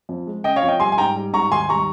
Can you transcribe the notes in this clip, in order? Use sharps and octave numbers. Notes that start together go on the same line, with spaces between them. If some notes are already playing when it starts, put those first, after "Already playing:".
F2
G#3
C#3 D#5 G5
C#5 F5
F2
D#5 G5
G3 G#5 C6
G#5
G#2 G5 A#5
G3
G#2 A#5 C#6
D#2 G#5 C6
G3 A#5 C#6